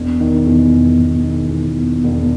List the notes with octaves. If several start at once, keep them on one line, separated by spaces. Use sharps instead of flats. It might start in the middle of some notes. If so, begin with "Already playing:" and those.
Already playing: E1
D#3
E2
E1
E1
D#3
E2
E1
E1